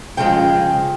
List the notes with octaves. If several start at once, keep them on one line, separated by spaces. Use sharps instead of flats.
C#3 F3 G#3 G5